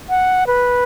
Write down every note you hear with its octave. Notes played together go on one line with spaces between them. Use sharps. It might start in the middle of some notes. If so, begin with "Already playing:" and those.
F#5
B4